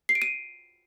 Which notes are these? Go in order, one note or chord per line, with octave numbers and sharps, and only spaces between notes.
C7
D7
D#7